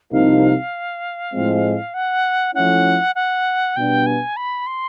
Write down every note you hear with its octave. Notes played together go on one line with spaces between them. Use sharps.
C2 C3 F3 A#3 D#4 F5
A2 F3 G#3 C4
F#5
F3 A3 C#4 E4 F#5
F#5
B2 G3 B3 D4 G5
G#5
B5
C6